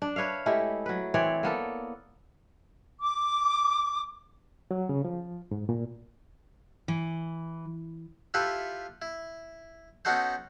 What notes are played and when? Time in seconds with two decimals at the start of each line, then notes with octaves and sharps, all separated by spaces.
0.02 D4
0.16 B4 C#5 E5 F5
0.46 G#3 A3 E4 G4
0.86 F#3 B4
1.14 E3 C4 C#5 D5
1.43 A#3 B3 A4
3.01 D6
4.71 F#3
4.89 C#3
5.05 F3
5.51 G#2
5.69 A#2
6.88 E3
8.34 E4 F4 G4 A4 B4 E5
9.02 E4
10.05 B3 C#4 D#4 F#4 A4 C5